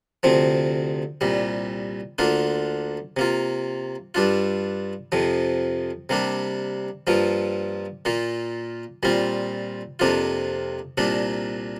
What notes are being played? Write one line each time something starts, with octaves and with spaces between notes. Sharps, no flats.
D2 C3 F3 C4
C2 A#2 G3
D2 D3 A#3 D4 F4
C3 A#3 F4
G2 G3 D4 F4
F2 C3 F3
C3 G3 A#3 D4
G2 F3 A#3 F4
A#2 A#3 F4
A#2 G3 C4 F4
F2 C3 A#3 D4 F4
C2 A#2 A#3 D4